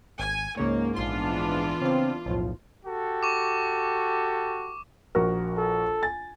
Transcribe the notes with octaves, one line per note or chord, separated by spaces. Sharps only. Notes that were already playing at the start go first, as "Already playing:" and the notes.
G#1 G#5
C#2 G#2 C#3 A#3 C#5
A#1 E3 B3 D4 F4 C6
C#3 C4 F5
B1 E2 A2 F3
F#4 G4 A4
C#6 D6
A#1 F#4 A#4
A4
G#5 A6